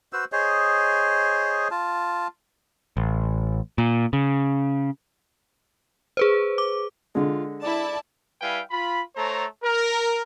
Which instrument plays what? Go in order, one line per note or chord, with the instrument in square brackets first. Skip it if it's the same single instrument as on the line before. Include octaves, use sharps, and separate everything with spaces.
[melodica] F#4 B4 C5 E6
G#4 C5 C#5 D#5
F4 A5
[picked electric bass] A1
A#2
C#3
[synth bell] G#4 B4 C5
D6
[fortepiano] D3 G#3 [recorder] F4
[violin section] E4 A5 [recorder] D5
[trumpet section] G3 E4 B4 F5 G5 G#5
F4 B5
A3 A4 C5 C#5 A#5
A#4